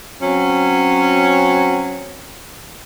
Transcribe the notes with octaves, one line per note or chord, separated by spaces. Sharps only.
F#3 C4 C#4